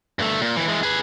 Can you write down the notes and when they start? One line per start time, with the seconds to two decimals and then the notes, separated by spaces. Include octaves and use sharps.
0.19 G2 A3
0.42 A#2
0.57 D#2 E3
0.68 E3 G#3
0.83 G#4 B4